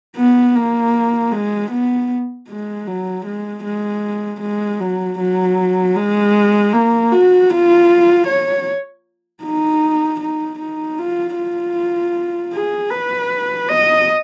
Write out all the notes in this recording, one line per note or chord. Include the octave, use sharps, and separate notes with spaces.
B3
A#3
G#3
B3
G#3
F#3
G#3
G#3
G#3
F#3
F#3
G#3
A#3
F#4
F4
C#5
D#4
D#4
D#4
F4
F4
G#4
B4
D#5